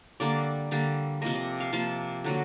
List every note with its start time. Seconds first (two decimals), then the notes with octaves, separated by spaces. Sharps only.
0.20 D3 G3 A#3 D5
0.71 D3 G3 A#3
1.22 C3 F3 A#3 D#5
1.35 D#5
1.60 F5
1.72 C3 F3 A#3 A5
2.24 D3 F#3 A#3